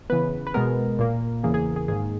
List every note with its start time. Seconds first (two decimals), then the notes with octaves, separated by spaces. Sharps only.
0.10 C#3 E3 B3 B4
0.47 B4
0.54 B2 G#3 B3 A#4
0.99 A#2 A#3
1.43 E2 C#3 E3 A#3 G#4
1.54 G#4
1.66 G#4
1.76 G#4
1.88 G#2 D#3 A#3 G#4